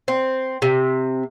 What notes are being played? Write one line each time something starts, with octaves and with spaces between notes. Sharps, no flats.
C4
C3